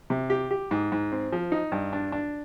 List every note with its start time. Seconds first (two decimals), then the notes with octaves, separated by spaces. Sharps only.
0.10 C3
0.30 G4
0.51 G4
0.71 G#2
0.92 G#2
1.12 C4
1.32 F3
1.52 D#4
1.72 G2
1.93 D4
2.12 D4